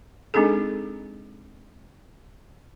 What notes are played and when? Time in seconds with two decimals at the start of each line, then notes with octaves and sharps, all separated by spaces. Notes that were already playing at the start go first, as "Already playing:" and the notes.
0.34 G#3 C4 D4 D#4 G#4 A4